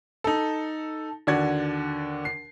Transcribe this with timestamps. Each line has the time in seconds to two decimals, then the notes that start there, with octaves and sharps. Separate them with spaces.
0.24 D#4 A4
1.27 D#2 D3 F#4 D5 F#5 G#6
2.25 C7